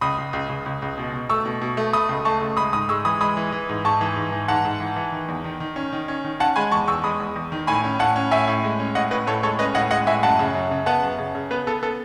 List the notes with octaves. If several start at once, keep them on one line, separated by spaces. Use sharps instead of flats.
C#2 B5 D#6
C#2
C#2
C#2
C#2
C#2
B2
B2
A3 C#6 E6
B2
B2
A3
A3 B5 D#6
C#2
A3 A5 C#6
C#2
G#3 B5 D#6
G#2 B5 D#6
G#3 C#6 E6
E3 B5 D#6
G#3 B5 D#6
E3
E3
G#2
G#2 A5 C#6
E3
G#2
E3
G#2 F#5 A5
G#2
E3
E3
D#3
E2
D#3
D#3
C#4
D#3
C#4
D#3
C#4 F#5 A5
G#3 G#5 B5
E2 A5 C#6
E2 C#6 E6
G#3 B5 D#6
E2
E2
D#3
A2 G#5 B5
C#4
A2 F#5 A5
C#4
A2 E5 G#5
A2
G#3
C#4
A2 D#5 F#5
A2 B4 D#5
A2 A4 C#5
G#3 A4 C#5
C#4 B4 D#5
A2 D#5 F#5
G#3 D#5 F#5
A2 E5 G#5
F#2 F#5 A5
C#3
F#2
C#3
B3 F#5 A5
F#2
C#3
C#3
B3 B4
B3 A4
B3 A4